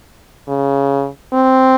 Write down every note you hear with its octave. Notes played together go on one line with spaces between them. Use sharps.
C#3
C4